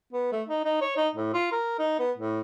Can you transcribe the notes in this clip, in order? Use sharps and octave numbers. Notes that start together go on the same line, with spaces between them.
B3
A3
D#4
D#4
C#5
D#4
A2
F4
A#4
D#4
B3
A2